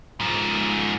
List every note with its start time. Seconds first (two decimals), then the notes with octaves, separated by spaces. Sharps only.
0.21 G#2 F3